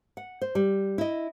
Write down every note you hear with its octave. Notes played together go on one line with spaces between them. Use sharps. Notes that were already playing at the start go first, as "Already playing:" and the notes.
F#5
C5
G3
E4 D#5